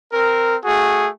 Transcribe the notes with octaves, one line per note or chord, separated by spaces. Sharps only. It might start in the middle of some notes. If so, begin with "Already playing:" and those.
C4 A#4
A3 F#4 G#4